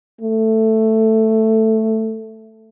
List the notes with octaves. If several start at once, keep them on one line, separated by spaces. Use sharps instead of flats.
A3